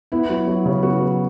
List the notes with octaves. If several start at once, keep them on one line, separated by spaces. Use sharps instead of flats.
B3 E4
F#3
F#3
C#3
B3 F#4
F#3